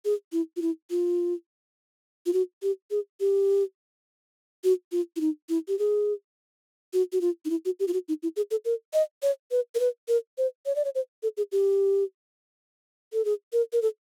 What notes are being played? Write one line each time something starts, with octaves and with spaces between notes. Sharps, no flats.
G#4
E4
F4
E4
F4
F4
F#4
G4
G#4
G4
F#4
F4
E4
D#4
E4
G4
G#4
F#4
F#4
F4
D#4
E4
F#4
G4
F4
F#4
D#4
E4
G#4
A4
A#4
D#5
C#5
B4
A#4
B4
A#4
C5
C#5
D5
C#5
C5
A4
G#4
G4
A4
G#4
A#4
A#4
A4